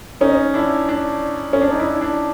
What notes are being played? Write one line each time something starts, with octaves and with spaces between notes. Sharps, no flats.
C#4 D#4
D4 E4
D4
C#4
D4
D#4
D4 E4
D4